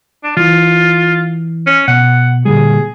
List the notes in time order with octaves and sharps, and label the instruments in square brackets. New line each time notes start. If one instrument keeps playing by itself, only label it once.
[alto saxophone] D4
[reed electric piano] E3 [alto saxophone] F4
[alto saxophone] C#4
[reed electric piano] B2 [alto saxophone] F#5
[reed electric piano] A#2 D3 G3 [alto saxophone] G#4